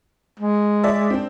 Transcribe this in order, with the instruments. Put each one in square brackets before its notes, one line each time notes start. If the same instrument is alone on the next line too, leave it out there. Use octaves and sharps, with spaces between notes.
[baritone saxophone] G#3
[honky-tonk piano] D5 E5
C4 D4